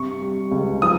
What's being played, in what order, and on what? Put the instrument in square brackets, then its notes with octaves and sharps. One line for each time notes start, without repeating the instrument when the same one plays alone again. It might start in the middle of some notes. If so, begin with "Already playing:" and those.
Already playing: [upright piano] G2 C3 C#6
G3
C#2
F3 D#6